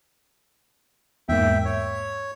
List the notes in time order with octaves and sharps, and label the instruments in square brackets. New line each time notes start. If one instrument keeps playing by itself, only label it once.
[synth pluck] E2 G#2 A#3 [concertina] E5 G5
[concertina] C#5